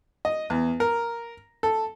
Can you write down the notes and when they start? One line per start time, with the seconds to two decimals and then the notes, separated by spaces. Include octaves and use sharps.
0.25 D#5
0.50 E2
0.80 A#4
1.63 A4